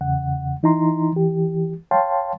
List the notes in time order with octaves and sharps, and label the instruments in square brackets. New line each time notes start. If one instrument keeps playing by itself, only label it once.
[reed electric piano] E2 C#3 F#5
E3 D#4 E4 A#5 C6
E3 G4
C#5 F5 G5 A5 C6